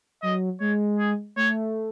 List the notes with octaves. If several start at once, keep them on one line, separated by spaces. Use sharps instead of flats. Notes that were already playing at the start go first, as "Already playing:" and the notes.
F#3 D#5
G#3 C#5
G#4
A3 C#5